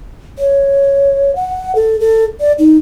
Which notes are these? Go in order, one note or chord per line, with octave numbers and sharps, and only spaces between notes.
C#5
F#5
A4
A4
D5
D#4